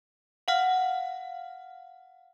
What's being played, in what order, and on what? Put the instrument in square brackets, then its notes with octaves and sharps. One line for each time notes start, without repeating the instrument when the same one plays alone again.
[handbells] F5 F#5 F6